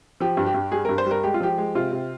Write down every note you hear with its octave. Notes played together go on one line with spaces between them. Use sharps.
F3 G4
G2
G4
G2
G3 G#4
G2 A#4
C5
G3
A#4
G#3 G4
F4
F3 G4
G#3
C3 F4
C3